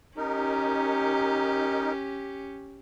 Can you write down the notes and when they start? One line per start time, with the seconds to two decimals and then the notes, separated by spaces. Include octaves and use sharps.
0.17 C#4 D#4 G4 A#4